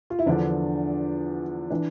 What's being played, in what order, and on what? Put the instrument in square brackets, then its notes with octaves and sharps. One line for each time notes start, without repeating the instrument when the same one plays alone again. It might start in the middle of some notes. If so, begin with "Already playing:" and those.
[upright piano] F4
E4
E2 D3 F3 D4
E3 D4